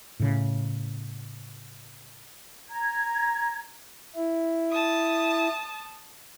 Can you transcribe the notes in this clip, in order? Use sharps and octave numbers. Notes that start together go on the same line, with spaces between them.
A2 C#3
A#5 G#6
E4
A5 D#6